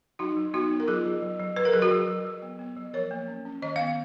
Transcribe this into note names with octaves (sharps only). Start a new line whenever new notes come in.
F#3 D#4 F#4
F#3
B3 D#4 F#4
B3
A#4
F#3 F4 G#4
F#3
F#3
F#3
F#3 B4
A#4
F#3 G#4
F#4 A#4
F#3
F#3
F#3
B3
B3
F#3
F3 A#4 C#5
A#3
C#4
C#4
D#3 D#5
B3 F5